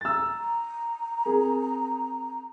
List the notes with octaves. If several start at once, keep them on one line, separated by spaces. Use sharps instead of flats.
A#5 E6 A6
C4 G#4 A#4